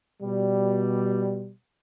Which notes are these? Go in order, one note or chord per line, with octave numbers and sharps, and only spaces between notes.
B2 G3